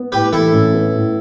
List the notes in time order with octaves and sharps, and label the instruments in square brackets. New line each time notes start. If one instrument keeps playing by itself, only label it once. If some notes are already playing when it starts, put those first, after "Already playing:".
Already playing: [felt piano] B3
[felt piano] A2 [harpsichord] G4 B4
[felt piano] E3 [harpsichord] E4 A4
[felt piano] A1
B3
A2